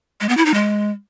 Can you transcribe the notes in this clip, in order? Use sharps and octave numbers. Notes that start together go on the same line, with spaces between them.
G#3
B3
E4
D#4
G#3